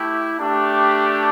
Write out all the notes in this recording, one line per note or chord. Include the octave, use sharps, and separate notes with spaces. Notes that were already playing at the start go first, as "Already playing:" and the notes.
Already playing: A3 E4 G4
A3 D4 G4